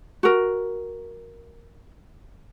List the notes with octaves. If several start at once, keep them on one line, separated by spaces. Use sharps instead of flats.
F#4 A#4